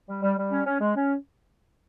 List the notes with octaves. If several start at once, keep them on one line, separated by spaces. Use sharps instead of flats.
G3
G3
G3
C#4
C#4
G#3
C#4